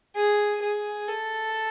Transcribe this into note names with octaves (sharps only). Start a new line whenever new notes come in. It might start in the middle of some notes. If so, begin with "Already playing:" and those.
G#4
G#4
A4